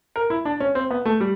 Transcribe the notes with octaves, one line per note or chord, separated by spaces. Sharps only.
A#4
E4
D4
C#4
C4
B3
A3
G3